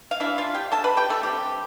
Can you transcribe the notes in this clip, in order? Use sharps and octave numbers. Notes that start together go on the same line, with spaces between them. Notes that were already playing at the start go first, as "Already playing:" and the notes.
F5
E3 G3 D4 E4 E5
F4 F5
G4 G5
A4 A5
B4 B5
G4 G5
A3 A4
D3 G3 C4 G4